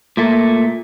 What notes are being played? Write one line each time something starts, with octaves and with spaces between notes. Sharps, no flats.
A#2 A3